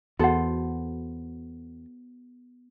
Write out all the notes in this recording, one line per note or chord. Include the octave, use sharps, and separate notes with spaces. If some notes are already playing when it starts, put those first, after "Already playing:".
E2 B3 F#4 A4 C5 F#5